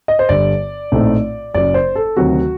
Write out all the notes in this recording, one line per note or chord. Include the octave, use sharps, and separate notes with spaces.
D#5
C5
G1 G2 D3 D5
A#1 A2 A3 C4 D#4
F#1 F#2 F#3 D5
C5
A4
D2 C3 D#3 F#3 C4 F#4